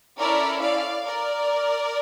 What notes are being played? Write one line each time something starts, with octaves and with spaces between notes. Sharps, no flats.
C#4 E4 A4 A#4 D5
D5 F5
A#4 D5